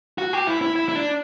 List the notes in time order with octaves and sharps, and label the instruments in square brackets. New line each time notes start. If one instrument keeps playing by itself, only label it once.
[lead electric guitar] F#4
G4
E4
E4
E4
E4
D4